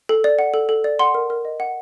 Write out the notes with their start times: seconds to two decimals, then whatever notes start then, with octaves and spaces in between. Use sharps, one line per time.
0.09 A4
0.24 D5
0.39 F#5
0.54 A4
0.69 A4
0.84 D5
0.99 F#5 C6
1.14 A#4
1.30 A#4
1.45 D#5
1.60 F#5